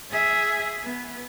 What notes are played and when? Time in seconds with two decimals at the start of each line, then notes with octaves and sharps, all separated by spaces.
0.11 G#4 E5
0.83 B3